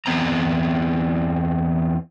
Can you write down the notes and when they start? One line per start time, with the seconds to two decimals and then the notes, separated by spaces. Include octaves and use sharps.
0.06 E2 B3 C4 A#5